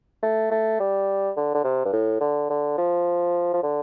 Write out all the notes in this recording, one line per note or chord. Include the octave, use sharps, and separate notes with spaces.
A3
A3
G3
D3
D3
C3
G2
A2
D3
D3
F3
F3
D3